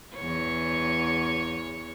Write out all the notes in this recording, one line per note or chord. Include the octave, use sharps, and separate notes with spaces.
E2 C#5